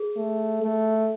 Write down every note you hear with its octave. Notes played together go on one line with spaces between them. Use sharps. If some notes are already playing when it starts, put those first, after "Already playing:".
Already playing: G#4
A3
A3